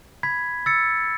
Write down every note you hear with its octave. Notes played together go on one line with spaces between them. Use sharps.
B5 G#6 B6
E6 A6 C#7